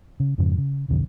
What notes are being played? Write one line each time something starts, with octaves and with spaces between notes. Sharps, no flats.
C#3
F2 G#2 C#3 F3
C#3
E1 B1 F2 D3